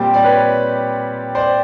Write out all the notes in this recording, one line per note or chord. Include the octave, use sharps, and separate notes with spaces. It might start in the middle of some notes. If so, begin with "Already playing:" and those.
Already playing: A#2 G3 C4 G4
D5
B4 C#5
C5 D5